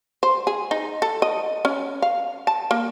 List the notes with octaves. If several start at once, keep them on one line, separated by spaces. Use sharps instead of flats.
C5
G#4
D#4
A4
D#5
C#4
F5
A5
A#3